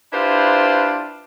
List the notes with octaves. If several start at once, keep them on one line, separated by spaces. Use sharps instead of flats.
D4 E4 F4 G4 B4 C5